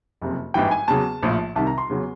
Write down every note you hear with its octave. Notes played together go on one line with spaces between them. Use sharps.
F#1 F2 C3
G#1 G2 E3 G5
G#5
E2 C#3 F#3 A5
A#1 A2 F3
C2 C3 D#3 A5
A#5
C6
E2 C#3 F#3